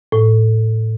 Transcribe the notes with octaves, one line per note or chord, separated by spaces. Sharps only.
A2